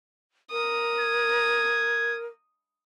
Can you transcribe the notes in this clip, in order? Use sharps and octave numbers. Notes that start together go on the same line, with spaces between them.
A#4 D#6
G#6